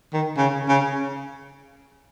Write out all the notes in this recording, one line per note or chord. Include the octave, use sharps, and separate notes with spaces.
D#3
C#3
C#3